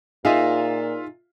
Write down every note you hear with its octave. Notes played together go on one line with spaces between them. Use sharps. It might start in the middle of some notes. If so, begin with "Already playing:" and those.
A#2 D#4 F4 G#4 E5 F5